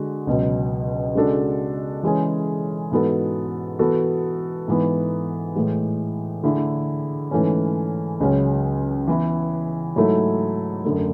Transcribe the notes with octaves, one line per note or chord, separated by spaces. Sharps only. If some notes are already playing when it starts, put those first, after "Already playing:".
Already playing: D3 G#3 F#4
C#2 B2 F#3
C#3 G#3 D4 F#4 A4
E3 G#3 C#4 G#4
G#2 E3 B3 F#4 A4
E3 B3 F#4 A4
G#2 E3 B3
A2 E3 G#3
D3 A3 E4 G#4
G#2 E3 A3 C#4
C#2 C#3 F#3 C#4
E3 B3 E4
G#2 F#3 A3 E4 A4
F#2 D3 A3